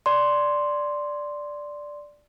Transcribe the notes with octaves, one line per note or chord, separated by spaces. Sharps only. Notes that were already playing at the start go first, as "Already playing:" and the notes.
D5 C6